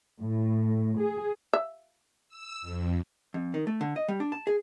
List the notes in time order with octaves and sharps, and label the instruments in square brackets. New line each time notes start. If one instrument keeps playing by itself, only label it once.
[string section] A2
G#4
[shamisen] E5
[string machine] E6
F2
[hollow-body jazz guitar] F2
D#3
A3
D3
D#5
G3
D4
A5
G#4